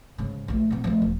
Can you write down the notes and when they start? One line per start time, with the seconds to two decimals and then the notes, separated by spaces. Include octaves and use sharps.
0.18 G#2 C#3
0.48 A#1 A3
0.71 A#2 C4
0.84 F3 A3
1.02 E1